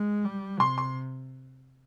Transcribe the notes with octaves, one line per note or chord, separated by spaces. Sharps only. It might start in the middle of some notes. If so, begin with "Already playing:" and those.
Already playing: G#3
G3
C3 C6
C6